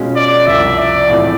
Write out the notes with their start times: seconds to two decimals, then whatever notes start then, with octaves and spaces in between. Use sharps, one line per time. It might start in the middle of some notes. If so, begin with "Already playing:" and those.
Already playing: B2 G#3 C#4 F4
0.16 D5
0.46 C2 C3 F3 E5
0.78 D5
1.09 A1 A2 F3 G#3 C4